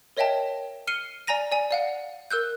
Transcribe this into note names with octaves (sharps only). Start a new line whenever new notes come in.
A#4 C#5 D#5 E5 G5 A5
F6 C7 C#7 D#7 G7
D5 G#5 A#5 A#6 D#7
D5 G#5
D5 F5 F#5
A#4 E6 F#6 G6